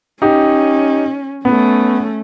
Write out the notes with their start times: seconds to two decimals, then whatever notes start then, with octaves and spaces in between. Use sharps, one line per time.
0.22 C#4 D#4 G4
1.45 A3 B3 C#4